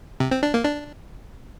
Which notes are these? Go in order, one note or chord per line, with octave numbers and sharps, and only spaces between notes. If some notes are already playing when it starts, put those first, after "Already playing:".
C3
C4
D4
A#3
D4